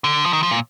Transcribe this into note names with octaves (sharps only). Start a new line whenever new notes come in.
D3
F3
D#3
F3
A#2